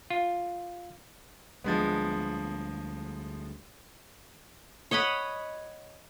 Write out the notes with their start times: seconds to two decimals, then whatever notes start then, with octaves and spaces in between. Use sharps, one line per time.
0.10 F4
1.64 D2 F3 G3 G#3 B3 D4
4.91 C#5 D#5 F#5 B5